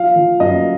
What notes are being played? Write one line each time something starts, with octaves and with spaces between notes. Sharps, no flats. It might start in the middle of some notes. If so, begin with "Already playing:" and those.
Already playing: F3 F5
F3
F#2 D#5